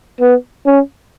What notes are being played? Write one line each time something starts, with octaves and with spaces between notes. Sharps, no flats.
B3
C#4